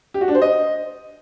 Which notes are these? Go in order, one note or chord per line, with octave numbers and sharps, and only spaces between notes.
G4
F#4
D4
C5
D#5